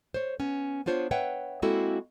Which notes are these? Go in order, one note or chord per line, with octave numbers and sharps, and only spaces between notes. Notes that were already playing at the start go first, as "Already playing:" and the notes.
C5 C#5
B3 C#4
B3 D4 F4 C5 C#5
B4 C#5 E5 F#5 G5
G#3 A#3 C4 E4 F#4 A4